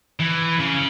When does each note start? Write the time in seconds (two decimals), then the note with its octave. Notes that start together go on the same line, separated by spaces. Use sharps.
0.20 E3
0.59 C#3